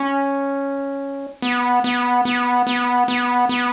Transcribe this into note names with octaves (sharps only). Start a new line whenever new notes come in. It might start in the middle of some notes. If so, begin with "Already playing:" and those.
Already playing: C#4
B3
B3
B3
B3
B3
B3